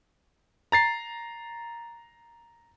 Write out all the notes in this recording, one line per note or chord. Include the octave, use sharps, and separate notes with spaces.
A#5 A6 C7